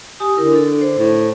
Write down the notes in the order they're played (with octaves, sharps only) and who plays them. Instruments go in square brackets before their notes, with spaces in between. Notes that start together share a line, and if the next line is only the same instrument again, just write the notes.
[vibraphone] G4 G#5 D#6
[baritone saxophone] D3 [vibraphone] E4 A#4
[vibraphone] D4 A4
C5
[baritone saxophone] A2